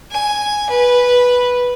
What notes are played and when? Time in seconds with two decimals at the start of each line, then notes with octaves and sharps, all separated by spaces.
0.12 G#5
0.70 B4